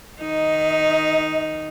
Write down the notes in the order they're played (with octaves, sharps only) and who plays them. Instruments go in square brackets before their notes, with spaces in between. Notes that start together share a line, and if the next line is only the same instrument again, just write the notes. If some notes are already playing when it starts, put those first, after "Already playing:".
[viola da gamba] D#3 D#4 [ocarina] D#5